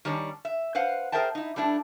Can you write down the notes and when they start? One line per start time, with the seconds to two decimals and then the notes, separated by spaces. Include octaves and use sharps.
0.05 D#3 G3 C#4 D4 C#5
0.45 E5
0.75 B4 C5 F5 F#5
1.12 G#4 A#4 C5 E5 G5 A5
1.35 D#4 E4
1.56 G3 A3 D4 E4